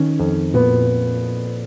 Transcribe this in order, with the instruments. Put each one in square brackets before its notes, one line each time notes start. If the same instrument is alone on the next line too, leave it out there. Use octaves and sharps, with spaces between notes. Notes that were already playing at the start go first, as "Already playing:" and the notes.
Already playing: [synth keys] D#3 [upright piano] C#4
[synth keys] F2
[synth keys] A#2 [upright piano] B3